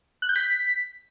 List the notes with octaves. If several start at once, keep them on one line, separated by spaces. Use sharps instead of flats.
F#6
G6
B6